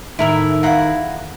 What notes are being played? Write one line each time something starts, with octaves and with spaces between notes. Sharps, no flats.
A2 D#3 E4 A#4 E5
E2 E4 F5 F#5 A#5